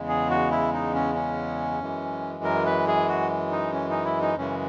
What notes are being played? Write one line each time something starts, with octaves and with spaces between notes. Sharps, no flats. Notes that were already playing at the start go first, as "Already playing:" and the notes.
Already playing: E2 C#3 G#3
G#4
F#4
E4
D#4
C#4
C#4
F#2 E3 G#3
A#4
B4
G#4
F#4
D#4
C#4
D#4
E4
D#4
F#2 C#3 E3 G#3 C#4